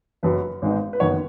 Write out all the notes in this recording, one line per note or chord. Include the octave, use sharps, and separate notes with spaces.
F#1 F#2 F#3 B4
G#1 G#2 G#3 B3 D#4
B4
F#1 F#2 D#3 B3 C#5